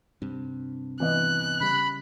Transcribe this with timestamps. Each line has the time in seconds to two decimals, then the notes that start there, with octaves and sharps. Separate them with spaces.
0.22 G2 C3
1.00 E3 B3 D#5 F#6
1.61 C#3 G3 B5